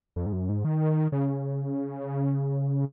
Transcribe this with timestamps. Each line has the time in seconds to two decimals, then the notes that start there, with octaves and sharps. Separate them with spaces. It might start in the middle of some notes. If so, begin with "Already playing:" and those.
0.16 F2
0.26 G#2
0.33 F#2
0.49 G#2
0.64 D#3
1.12 C#3